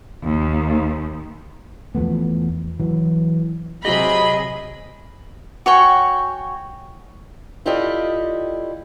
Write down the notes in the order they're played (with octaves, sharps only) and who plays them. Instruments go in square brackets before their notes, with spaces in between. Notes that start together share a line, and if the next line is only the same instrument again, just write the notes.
[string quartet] D#2
[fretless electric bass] E2 F3 A3 B3
E3 F#3
[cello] C3 G#4 [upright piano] F#3 G4 [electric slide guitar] D#5 [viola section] B5
[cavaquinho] F#4 C#5 G5 G#5
[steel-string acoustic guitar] E4 F4 G4 A4 D5 D#5